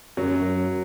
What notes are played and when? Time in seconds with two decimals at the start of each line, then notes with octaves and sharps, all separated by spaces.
0.17 F#2 F#3